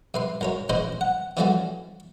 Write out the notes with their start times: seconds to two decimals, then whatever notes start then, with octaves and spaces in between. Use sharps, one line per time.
0.14 C3 B4 C6
0.41 F#2 A#4 C#5
0.69 A1 C#4 G#4 B4 C5 D#5
1.01 F#5
1.37 E3 F3 G3 A3 C#4 F#4